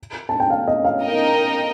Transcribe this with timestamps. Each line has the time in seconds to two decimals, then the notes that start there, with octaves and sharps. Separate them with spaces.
0.29 A5
0.40 G5
0.50 F5
0.68 D#5
0.85 F5
1.02 D#4 A#4 D#5 G5